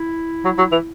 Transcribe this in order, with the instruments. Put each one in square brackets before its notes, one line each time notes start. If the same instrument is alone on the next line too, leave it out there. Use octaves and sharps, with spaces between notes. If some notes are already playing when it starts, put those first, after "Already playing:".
Already playing: [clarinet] E4
[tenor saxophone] F#3
F#3
E3